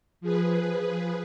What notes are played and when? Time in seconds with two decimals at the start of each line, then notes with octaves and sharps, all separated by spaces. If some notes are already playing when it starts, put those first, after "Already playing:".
0.21 F3 G#4 B4